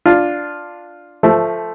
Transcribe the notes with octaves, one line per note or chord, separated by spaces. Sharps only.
D4 F4
F3 A3